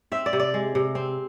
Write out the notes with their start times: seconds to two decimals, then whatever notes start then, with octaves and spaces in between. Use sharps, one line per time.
0.12 C4 E5
0.26 D5
0.33 C3
0.40 D5
0.54 G#3
0.75 C3
0.95 C4